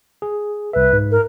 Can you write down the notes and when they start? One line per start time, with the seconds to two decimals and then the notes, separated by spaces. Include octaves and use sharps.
0.22 G#4
0.73 C2 B4 E5
0.93 G#2
1.11 A#4